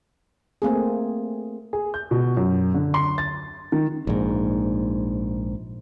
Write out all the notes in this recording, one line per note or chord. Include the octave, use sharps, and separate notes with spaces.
A3 A#3 C4 G#4
G#4
G6
B2
F#2
D3
C6
A6
D#3
A#1 G#2